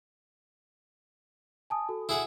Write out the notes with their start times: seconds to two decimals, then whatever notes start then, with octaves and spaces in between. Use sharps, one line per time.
1.70 G#5 A5 D#6
1.89 F#4 A4
2.09 E4 G#4 F#5